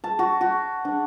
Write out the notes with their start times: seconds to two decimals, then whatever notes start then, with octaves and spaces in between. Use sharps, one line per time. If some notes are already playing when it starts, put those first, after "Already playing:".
0.04 A5
0.19 F#4
0.41 F#4
0.85 D4